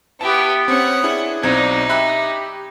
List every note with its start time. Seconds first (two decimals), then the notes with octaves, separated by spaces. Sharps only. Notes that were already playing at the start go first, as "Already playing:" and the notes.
0.21 B3 E4 G4 A5
0.68 C4 C#4 C#5 F#5
1.03 D4 E4 G#4
1.43 B1 C4 D4 D#4 G#6
1.89 G4 E5 B5 F#6